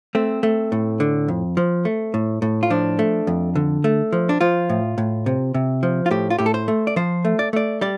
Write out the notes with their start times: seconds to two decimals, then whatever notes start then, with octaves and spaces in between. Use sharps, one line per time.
0.15 A3 C4
0.43 A3
0.72 A2
1.00 D3
1.28 F2
1.57 F3
1.85 A3
2.14 A2
2.42 A2
2.63 F4
2.70 F3 D4
2.99 A3
3.27 F2
3.56 D3
3.84 A3
4.13 F3
4.29 D4
4.41 F3 F4
4.69 A2
4.98 A2
5.26 C3
5.54 C3
5.83 F3
6.06 F4
6.11 A2 G4
6.30 F4
6.38 A2 G4
6.46 A4
6.54 C5
6.68 A3
6.87 D5
6.96 F3 C5
7.25 A3
7.39 D5
7.53 A3 D5
7.81 G3 D5